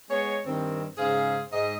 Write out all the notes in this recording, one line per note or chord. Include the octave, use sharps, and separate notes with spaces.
G#3 B3 C#5
G2 D#3 C4
G#2 C#3 G#4 C5 F5
G#2 D#5